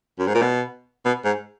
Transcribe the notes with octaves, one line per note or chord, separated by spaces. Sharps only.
F#2
G#2
A#2
B2
B2
G#2